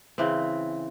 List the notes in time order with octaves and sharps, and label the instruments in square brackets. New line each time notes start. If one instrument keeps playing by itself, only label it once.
[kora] C#3 E3 C4